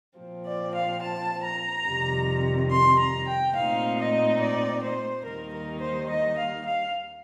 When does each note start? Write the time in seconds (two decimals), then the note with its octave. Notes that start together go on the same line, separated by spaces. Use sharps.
0.18 A#2 F3 C4
0.46 D5
0.75 F5
1.02 A5
1.44 A#5
1.86 F2 C3 D#3 G3
2.71 C6
2.99 A#5
3.28 G5
3.55 A#2 A3 C4 D#4 F5
3.98 D#5
4.40 D5
4.83 C5
5.25 D#2 D#3 G3 A#3 D#4 A#4
5.53 A#4
5.81 C5
6.10 D#5
6.38 F5
6.66 F5